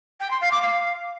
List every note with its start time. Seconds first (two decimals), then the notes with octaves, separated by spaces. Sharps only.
0.20 G5
0.30 C6
0.41 F5
0.51 D6
0.62 F5